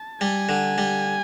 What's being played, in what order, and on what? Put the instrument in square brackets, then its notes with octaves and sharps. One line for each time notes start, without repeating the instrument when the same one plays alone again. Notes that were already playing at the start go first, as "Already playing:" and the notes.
Already playing: [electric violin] A5
[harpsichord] G3 [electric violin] G#5
[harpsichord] D3
G3